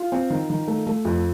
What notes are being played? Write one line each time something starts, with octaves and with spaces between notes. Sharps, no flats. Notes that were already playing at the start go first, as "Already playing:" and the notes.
Already playing: F4
C4
D#3
D#3
A3
A3
F2